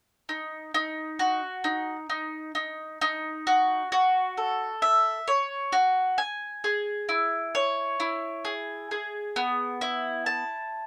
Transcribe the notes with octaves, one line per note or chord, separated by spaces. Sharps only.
D#4
D#4
F#4
D#4
D#4
D#4
D#4
F#4
F#4
A4
E5
C#5
F#4
G#5
G#4
E4
C#5
E4
G#4
G#4
B3
E4
A5